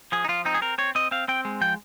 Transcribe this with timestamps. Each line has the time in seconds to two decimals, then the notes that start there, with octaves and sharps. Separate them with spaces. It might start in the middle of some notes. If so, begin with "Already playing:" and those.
0.12 F3 G#4
0.25 D#4
0.28 F3 F4
0.45 C4 D#4
0.54 G#4
0.62 C4 A#4
0.78 C4 C#5
0.95 C4 D#5
1.11 C4 F5
1.28 C4 G5
1.45 G#3
1.61 F3 G5